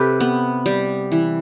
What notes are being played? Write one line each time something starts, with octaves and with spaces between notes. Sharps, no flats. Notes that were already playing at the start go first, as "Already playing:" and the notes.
Already playing: C3 G4 A4 B4
B3
G3
E3